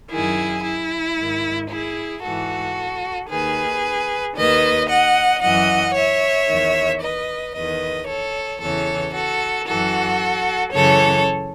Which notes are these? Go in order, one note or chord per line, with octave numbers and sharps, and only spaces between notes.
F#2 D#3 E4 G#4
E4
G#2 D#3
E4 G#4
G#2 E3 F#4 A4
D#2 D#3 G#4 B4
D#2 D#3 B4 D#5
D#5 F#5
F#2 E3 D#5 F#5
C#5 E5
E2 D#3
B4 D#5
E2 D#3 B4 D#5
A4 C#5
E2 C#3 E3 A4 C#5
F#4 A4
F#2 E3 F#4 A4
F#2 C#3 E3 A4 C#5